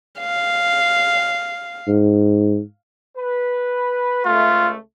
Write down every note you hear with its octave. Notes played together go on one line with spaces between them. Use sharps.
F5
G#2
B4
C#2 A3 F4